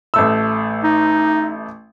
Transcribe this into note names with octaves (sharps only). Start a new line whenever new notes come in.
A1 A3 E6
D#4